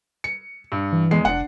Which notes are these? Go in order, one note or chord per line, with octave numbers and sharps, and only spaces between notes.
C#7
G2
E3
E2 G#3 C7
F1 D4 F#5